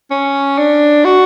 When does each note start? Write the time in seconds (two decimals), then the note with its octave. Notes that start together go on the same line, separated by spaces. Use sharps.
0.11 C#4
0.58 D4
1.05 F#4